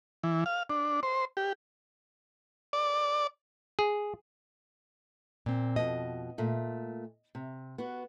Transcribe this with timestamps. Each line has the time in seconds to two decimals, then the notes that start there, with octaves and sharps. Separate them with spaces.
0.23 E3
0.46 F5
0.70 D4
1.03 C5
1.37 G4
2.73 D5
3.79 G#4
5.46 A#2 C4
5.76 F2 B2 D#5
6.38 A#2 A3
7.35 C3
7.78 B3 F#4